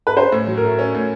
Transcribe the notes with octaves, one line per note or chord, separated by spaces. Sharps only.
B4
C#4 C5
A2
F#3
A#4
A3
C#4
A2